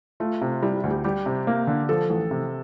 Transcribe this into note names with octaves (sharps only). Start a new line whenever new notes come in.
A3 F4
C3
G3 E4
G4
D2
G4
G3 G4
C3
A#3
D3
F3 A4
A1
C3